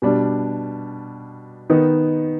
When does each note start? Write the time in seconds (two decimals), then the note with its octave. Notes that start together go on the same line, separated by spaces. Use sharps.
0.02 B2 G3 D4
1.70 D#3 B3 D#4